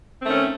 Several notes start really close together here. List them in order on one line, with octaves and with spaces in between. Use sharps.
C4 A3 D#3 C#4